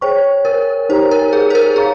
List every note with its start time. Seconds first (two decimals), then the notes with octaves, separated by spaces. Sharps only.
0.01 G#4 C5 C#5 G5 C#6
0.45 A#4
0.89 D#4 G4 C5 C#5 G5 A#5
1.11 A#4
1.33 G#4
1.50 C5
1.55 A#4
1.76 G#4 C#5 F5 A#5 C#6